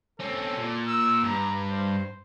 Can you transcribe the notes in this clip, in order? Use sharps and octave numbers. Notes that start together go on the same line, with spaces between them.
C4 C#4 A4
A#2
E6
G2 A#5
C5